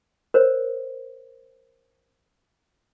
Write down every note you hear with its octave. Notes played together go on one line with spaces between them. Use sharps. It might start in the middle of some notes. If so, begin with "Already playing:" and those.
A#4 C5 C#5